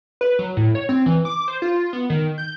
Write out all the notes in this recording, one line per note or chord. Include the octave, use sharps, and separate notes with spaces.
B4
F#3
A2
C#5
C4
E3
D6
C5
F4
B3
D#3
G6